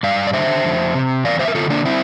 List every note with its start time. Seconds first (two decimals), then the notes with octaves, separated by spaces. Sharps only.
0.03 G2 D5 F5
0.27 D5
0.33 D3 C5 E5
0.64 F2
0.94 C3
1.24 E2 D5 F5
1.39 C5 E5
1.48 A#4
1.55 D3 F4 A4
1.70 A#3 D4
1.85 C4 E4